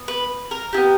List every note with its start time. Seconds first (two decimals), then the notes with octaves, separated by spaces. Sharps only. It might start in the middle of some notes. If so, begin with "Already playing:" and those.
Already playing: B3
0.08 B4
0.51 A#4
0.73 B3 E4 G4